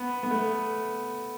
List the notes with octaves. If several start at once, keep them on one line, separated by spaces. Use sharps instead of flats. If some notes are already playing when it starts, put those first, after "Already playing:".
Already playing: B3
B3
A3